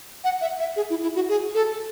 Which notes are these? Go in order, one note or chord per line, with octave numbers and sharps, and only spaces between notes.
F#5
E5
E5
G#4
E4
E4
F#4
G#4
A4